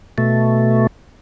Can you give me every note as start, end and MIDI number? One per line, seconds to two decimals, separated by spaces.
0.18 0.87 47
0.18 0.87 57